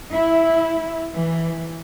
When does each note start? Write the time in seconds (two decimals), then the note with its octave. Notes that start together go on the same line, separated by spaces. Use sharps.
0.14 E4
1.15 E3